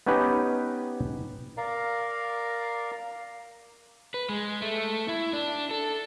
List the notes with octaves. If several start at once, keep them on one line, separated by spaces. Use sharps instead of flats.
B3 C#4 D#4 G4 B4
A#4 D5 F5 A#5
B4
G#3
A3
E4
D4
A4